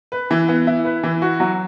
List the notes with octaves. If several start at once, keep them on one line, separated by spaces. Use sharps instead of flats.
B4
E3
B3
E4
B4
E3
F#4
F#3